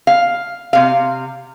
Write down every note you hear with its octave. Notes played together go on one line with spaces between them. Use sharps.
F5
C3 F5